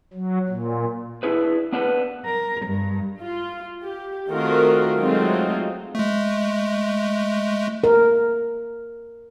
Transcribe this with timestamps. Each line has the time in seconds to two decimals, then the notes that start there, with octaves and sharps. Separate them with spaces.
0.13 F#3
0.49 A#2
1.23 D4 E4 G#4 B4
1.72 B3 D4 A#4 B4
2.25 A#4
2.66 G2
3.20 F4
3.82 G4
4.28 D#3 A3 C4 F4 F#4 A#4
4.97 F#3 G#3 A3 C4 D#4 F4
5.95 G#3 A3
7.84 A#4